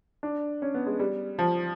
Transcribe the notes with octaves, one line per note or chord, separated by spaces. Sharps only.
D4
C#4
B3
G#3
G3
F3